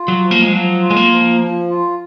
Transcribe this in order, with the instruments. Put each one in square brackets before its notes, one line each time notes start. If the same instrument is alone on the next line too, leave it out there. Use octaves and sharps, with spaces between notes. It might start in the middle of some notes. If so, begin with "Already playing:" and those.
Already playing: [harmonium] F4
[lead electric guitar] F#3
[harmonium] F3
[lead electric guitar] A#3
G#3
[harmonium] F3 [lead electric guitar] F#3
[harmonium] F4
[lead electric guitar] G#3
A#3
[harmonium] F3
F3
F4